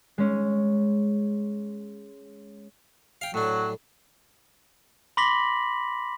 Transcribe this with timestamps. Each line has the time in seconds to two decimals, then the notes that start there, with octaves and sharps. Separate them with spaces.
0.18 G#3 C#4
3.21 F5 G5
3.34 A2 F#3 D4
5.17 B5 C6 D6 A#6 B6 F#7